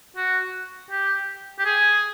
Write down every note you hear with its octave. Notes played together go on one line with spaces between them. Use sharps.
F#4
G4
G4
G#4